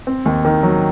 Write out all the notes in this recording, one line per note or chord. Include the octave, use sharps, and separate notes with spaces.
C4
D#2
D#3
F#3